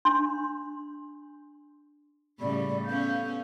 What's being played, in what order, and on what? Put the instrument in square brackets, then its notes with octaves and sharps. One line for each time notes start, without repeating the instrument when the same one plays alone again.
[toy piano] D4 C6
[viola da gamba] A2 C#3 G3 [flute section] D5 B5
[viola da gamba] B3 C#4 [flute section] A4 F5 G6